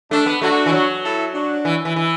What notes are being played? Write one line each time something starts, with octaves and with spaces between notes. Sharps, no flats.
A3 D4
B3
A3 D4 F#4
E3
F#3
E4 A4
D4 F#4
E3
E3
E3